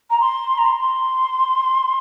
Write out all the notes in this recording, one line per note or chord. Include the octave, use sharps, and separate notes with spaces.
A#5
C6
A#5
C6